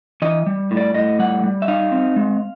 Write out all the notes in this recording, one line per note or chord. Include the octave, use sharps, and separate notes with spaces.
E3 D#5
G3
A2
D5
A2 D#5
G3 F#5
G3
E5
D#4 F5
C4
G#3